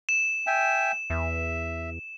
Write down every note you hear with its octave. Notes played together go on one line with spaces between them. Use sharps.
E7
E5 G5 G#5
E2 E5